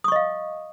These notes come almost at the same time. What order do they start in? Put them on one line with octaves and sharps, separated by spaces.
D#6 C#6 D#5 F5